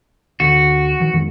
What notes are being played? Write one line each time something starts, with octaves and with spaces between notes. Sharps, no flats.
D2 D3 F#4
D#3 F3
F2 D#3 G#3